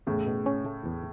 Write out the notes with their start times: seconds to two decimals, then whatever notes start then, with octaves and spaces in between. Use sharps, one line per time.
0.07 E2 A2 C#3
0.27 B2
0.46 C#4
0.66 A3
0.86 E2